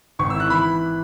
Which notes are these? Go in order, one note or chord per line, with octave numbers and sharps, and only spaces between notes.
G#1 C#6
E4 E6
F#6
E3 B5